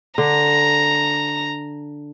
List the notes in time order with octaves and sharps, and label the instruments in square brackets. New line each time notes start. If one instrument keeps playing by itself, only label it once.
[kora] D3 [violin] A#5